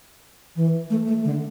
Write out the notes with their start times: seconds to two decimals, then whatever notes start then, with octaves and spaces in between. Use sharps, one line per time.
0.56 E3
0.90 A3
1.07 A3
1.24 D3